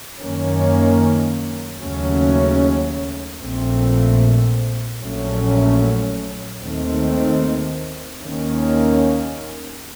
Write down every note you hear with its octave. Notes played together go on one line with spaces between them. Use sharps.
F#2 D#3 A#3 C#4
D#2 C#3 F#3 A3 C#4
A#1 A#2 A3 C4
A#1 A#2 F#3 A3 C#4
D#2 D#3 A3 C4
D#2 D#3 A#3 C#4